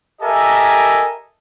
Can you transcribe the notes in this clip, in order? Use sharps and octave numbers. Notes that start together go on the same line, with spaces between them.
G4 A4 A#4 D#5 E5 G#5